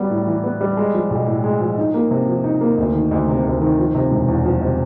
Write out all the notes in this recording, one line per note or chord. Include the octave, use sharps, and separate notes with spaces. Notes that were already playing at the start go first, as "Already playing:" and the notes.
Already playing: F#3 G3 B3
A2
E3
B3
G3
G#3
F3
B1
A2
G#3
F3
D#4
A#3
C3
F3
D#4
A#3
D2
D#3
D2
C3
D2
D#3
F3
C3
E1
E2
F3
C3